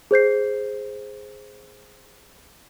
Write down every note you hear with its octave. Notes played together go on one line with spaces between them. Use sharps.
G#4 C5 G6 C7